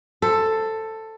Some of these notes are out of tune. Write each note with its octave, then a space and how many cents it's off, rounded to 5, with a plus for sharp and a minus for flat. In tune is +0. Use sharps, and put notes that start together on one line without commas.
A4 +10 C5 +0